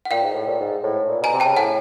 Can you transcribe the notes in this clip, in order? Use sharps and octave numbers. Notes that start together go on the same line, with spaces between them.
F#5
A#2 F5 G5
G#2
A2
A#2
G#2
A2
A#2
B2 G#5 A#5
C3
C#3 G5 A5
A2 F#5 G#5